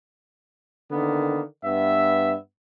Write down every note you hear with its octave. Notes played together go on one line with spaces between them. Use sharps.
D3 D#3 A#3 B3
G2 B3 E5